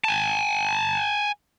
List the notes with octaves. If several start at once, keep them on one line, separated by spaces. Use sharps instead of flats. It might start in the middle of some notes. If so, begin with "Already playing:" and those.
G#5 A5